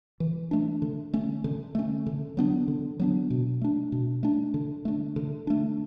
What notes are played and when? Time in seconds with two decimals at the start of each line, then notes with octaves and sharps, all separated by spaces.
0.20 E3
0.51 A3 D4
0.82 D3
1.14 A3 C#4
1.44 D3
1.75 A3 C#4
2.06 D3
2.37 F#3 B3 D4
2.68 D3
3.00 F#3 B3 D4
3.30 B2
3.61 A3 D4
3.92 B2
4.23 A3 D4
4.54 D3
4.85 A3 D4
5.16 D3
5.47 A3 D4